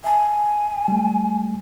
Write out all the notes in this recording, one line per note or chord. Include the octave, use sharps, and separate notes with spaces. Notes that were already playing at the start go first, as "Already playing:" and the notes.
E5 G#5 A5
G3 A3